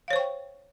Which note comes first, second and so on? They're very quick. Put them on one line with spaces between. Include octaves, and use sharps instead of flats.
F5 C#5 C5 C#6 G5